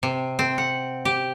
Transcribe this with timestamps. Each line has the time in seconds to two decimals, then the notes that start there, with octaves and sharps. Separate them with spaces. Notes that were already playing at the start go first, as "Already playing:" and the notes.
0.03 C3
0.39 C4
0.58 F#5
1.05 G4